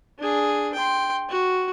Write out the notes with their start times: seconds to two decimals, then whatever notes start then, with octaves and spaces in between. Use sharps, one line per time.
0.18 D4 G#4
0.74 G5 C6
1.29 F#4